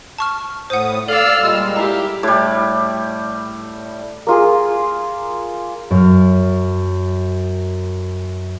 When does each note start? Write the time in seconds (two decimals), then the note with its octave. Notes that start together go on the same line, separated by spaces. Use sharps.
0.18 A5 C#6 F6
0.70 A2 C5 F#5 D#6
1.08 A4 D5 F5 E6 F6
1.41 A#2 G3 G#3
1.76 E4 G4 F5 A#5
2.23 A2 G3
4.27 A#3 F4 G#4
5.91 F#2 F6